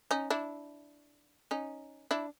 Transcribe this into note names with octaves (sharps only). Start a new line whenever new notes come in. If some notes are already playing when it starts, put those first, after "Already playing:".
C#4 D#4
D4 E4
C#4 D#4
D4 E4